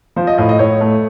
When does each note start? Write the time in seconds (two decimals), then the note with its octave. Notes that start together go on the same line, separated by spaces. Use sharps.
0.16 F3 C5
0.27 D#5
0.38 A2 D#5
0.49 D#5
0.59 A2 C#5
0.81 A3